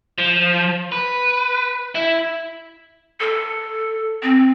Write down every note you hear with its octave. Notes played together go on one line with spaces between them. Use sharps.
F3
B4
E4
A4
C4